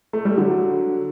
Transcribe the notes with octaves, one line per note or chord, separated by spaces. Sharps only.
A3
G3
D3 F#3